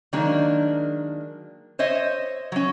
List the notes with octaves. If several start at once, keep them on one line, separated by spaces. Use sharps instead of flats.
D#3 F#3 G#3 A#3 D4
C5 C#5 D#5 E5
F#3 C#4